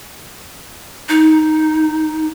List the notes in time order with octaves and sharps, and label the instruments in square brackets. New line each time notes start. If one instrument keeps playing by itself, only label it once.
[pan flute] D#4